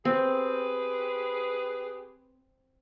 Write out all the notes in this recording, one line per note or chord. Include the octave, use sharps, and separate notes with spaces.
C4 G4 G#4 B4